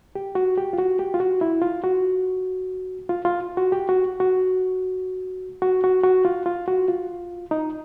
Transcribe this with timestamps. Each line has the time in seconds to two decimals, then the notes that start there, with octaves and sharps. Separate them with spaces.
0.15 G4
0.35 F#4
0.58 G4
0.73 F4
0.78 F#4
0.99 G4
1.14 F4
1.20 F#4
1.41 E4
1.62 F4
1.84 F#4
3.09 F4
3.25 F4
3.57 F#4
3.72 G4
3.89 F#4
4.20 F#4
5.62 F#4
5.84 F#4
6.04 F#4
6.25 F4
6.46 F4
6.68 F#4
6.88 F4
7.51 D#4